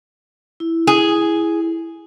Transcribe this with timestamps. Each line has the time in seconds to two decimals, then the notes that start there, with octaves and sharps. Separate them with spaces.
0.60 E4
0.87 G#4